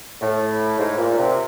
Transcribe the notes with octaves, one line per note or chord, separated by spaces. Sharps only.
A2
G#2
A#2
C3